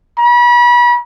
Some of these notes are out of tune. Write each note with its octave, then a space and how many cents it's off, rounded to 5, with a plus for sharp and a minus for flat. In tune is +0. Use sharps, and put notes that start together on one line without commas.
B5 -35